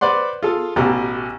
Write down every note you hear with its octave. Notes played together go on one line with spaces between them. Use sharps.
B4 C5 D5 F#5 C6
F4 G#4 A4
A1 B2 G4 A4 A#5